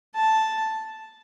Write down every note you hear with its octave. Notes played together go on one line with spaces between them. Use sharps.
A5